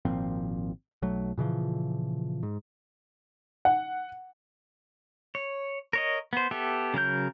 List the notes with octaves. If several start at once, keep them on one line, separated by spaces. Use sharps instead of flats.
G#1 A#2 F3 C4
B1 F#3 A3
A#2 C#3 E3 F3
G#2
F#5
C#5
A#4 C#5 D#5
B3 C5
B3 G4 A4 E5
C#3 F#3 A#4 G6